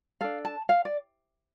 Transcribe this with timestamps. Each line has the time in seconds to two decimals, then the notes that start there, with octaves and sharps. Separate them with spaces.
0.21 D4 A4 F5
0.45 A5
0.69 F5
0.85 D5